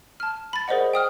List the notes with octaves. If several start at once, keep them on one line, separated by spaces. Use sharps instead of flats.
A5 F6
B5 A6
G#4 A#4 C5 D5 D#5 F#5
G5 D#6 F6